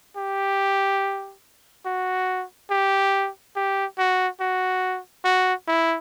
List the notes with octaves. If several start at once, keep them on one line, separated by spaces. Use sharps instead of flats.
G4
F#4
G4
G4
F#4
F#4
F#4
E4